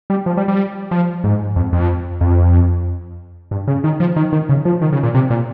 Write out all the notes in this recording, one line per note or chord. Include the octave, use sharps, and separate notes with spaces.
G3
F3
G3
G3
F3
G#2
F2
F2
F2
G2
C#3
D#3
F3
D#3
D#3
C#3
F3
D#3
C#3
A#2
C3
A#2